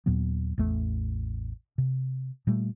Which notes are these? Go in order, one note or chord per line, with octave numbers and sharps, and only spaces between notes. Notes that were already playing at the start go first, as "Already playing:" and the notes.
D#2 A#2 F#3 B3
A1 E2 A3
C3
A#2 G3 A3